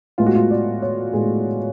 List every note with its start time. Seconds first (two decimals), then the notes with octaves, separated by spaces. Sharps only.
0.18 A2 G#3 B3 F4
0.26 F#4
0.35 F4
0.51 D5
0.82 C#5
1.13 A2 G#3 B3 G#4